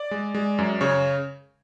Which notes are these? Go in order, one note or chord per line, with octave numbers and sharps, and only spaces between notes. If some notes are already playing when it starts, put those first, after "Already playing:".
Already playing: D5
G#3
G#3
F#2
C#3 C#5